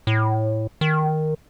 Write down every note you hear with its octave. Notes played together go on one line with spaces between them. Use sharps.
A2
D#3